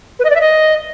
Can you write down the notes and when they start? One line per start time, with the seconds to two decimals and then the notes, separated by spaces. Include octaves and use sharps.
0.19 B4
0.25 D#5
0.30 D5
0.35 E5
0.41 D#5